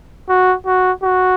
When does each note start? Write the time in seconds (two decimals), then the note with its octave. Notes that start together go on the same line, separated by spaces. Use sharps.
0.29 F#4
0.66 F#4
1.03 F#4